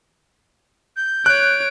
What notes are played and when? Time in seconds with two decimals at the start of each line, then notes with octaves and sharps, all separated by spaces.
0.97 G6
1.26 C#5 F#6 D7